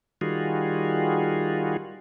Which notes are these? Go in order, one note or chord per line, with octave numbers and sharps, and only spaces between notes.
D#3 G3 F4 F#4 G#4